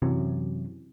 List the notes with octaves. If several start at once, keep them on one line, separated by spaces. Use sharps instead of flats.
F#2 C3 E3 F#3